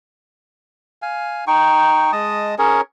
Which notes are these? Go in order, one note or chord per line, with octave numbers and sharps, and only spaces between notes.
F5 G#5
D#4 G5 C#6
G#3 D#5 A5 D#6
C#4 G#4 A#4 C#5